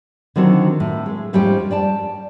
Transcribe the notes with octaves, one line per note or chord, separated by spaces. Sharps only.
D3 D#3 F#3 C4 F4
A2
G#3
F2 G#2 G3 C#4 F4 G5
D5 G5 A5